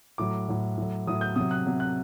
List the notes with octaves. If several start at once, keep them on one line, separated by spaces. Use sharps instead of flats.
A2 F#3 D6
A2 F#3
A2 F#3
A2 F#3 D#6
G6
C3 F#3 D#6
F#6
C3 F#3
F#6